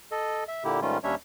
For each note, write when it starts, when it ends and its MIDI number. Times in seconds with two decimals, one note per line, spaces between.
0.12 0.44 69
0.12 0.44 75
0.48 0.64 76
0.64 0.80 46
0.64 0.80 50
0.64 0.80 58
0.64 0.80 64
0.64 0.80 67
0.81 0.98 44
0.81 0.98 51
0.81 0.98 55
0.81 0.98 57
0.81 0.98 61
0.81 0.98 65
1.04 1.15 39
1.04 1.15 55
1.04 1.15 61
1.04 1.15 62
1.04 1.15 73
1.04 1.15 76